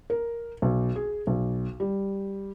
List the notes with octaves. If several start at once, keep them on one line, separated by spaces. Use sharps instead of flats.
A#4
B1
G#4
B1
G3